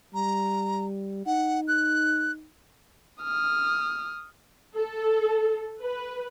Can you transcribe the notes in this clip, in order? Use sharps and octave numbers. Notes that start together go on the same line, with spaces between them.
G3 A#5
D#4 F#5
F#6
D#6 F6
A4
B4